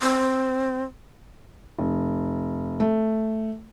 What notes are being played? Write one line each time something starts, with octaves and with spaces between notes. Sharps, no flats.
C4
F1
A3